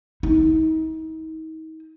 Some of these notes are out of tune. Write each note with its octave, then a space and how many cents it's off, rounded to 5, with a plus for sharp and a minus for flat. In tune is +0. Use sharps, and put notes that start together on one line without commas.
D#4 +40